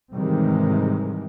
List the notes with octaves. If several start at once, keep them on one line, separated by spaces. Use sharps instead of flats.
G#2 C3 D#3 E3 G3 G#3